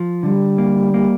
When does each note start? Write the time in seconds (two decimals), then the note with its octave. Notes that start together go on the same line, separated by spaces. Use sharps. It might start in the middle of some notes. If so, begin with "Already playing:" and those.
Already playing: F3
0.23 D3 G3
0.58 A#3
0.94 A#3